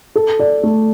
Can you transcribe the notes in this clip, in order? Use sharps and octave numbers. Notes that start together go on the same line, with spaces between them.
A4
D5
A3